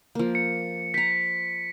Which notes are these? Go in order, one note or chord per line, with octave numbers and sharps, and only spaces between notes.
F3 A#3
C#7
C5 A#5 B6